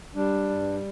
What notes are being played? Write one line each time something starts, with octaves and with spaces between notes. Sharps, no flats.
G3 D4
G2